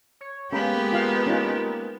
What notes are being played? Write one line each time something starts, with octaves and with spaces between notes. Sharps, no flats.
C#5
G#3 A#3 B3 C#4 G4 B4 B5
F4 F5
C#4 D#4 F4